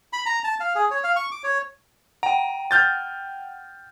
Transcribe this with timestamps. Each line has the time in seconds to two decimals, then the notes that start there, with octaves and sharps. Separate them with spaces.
0.13 B5
0.26 A#5
0.44 A5
0.60 F5
0.75 G#4
0.91 C#5
1.04 F5
1.16 C#6
1.32 D6
1.44 C#5
2.23 F#5 G5 A#5
2.71 F6 G6 A6